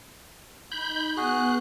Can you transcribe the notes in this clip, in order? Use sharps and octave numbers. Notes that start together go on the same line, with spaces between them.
D#4 B5 G6
B3 F#4 G#4 F#6 G6